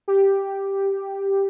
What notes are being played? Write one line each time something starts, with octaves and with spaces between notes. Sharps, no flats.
G4